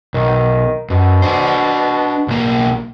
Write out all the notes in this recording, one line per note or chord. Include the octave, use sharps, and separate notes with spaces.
B1 D#3
F#2 B2
D4 C5
B1 A#3